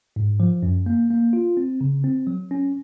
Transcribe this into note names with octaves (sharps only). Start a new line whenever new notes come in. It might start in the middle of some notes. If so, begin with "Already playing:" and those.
G#2
F3
F#2
A#3
A#3
F4
C4
C#3
C4
F#3
C#4